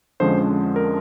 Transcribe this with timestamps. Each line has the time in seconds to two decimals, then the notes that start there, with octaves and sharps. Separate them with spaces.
0.20 F2 D3 F3 G#3 C#4 C5
0.76 A#4